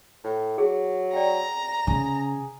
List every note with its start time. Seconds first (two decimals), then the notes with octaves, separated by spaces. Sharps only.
0.24 A2
0.58 F#3 G#4
1.14 D5 G5 A#5
1.87 C#3 G#4